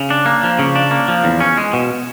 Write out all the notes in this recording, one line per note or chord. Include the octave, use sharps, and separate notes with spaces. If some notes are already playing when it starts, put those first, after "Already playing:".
Already playing: C#3
D4
A#3
F3
C#3
D4
A#3
F3
E2
C#4
G#3
B2